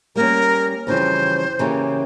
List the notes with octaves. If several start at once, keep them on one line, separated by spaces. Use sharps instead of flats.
G3 A#3 C#4 A#4
F2 C#3 E3 G3 C5
C#3 E3 A#3 C#4 G4